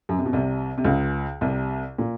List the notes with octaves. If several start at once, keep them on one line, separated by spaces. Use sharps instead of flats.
F#2
C3
B2
C2 C3
C3
C#2 C#3
C2 C3
A#2